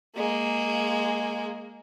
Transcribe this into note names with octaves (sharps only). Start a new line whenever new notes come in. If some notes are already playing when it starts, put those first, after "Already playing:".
G#3 A#3